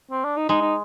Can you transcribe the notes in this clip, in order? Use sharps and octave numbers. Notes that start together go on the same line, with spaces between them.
C4
D4
D#4
G#3 D#4
D#4